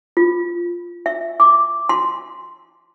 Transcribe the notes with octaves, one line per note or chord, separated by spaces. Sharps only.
F4
E5
D6
C6